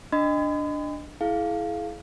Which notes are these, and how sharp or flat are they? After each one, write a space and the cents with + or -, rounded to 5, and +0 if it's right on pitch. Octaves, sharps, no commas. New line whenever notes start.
D4 +0 D#5 -10 B5 +45
E4 +0 G#4 +35 F5 +0